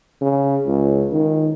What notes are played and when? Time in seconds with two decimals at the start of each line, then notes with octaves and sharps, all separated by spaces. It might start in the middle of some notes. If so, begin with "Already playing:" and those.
0.21 C#3
0.67 C#2
1.12 D#3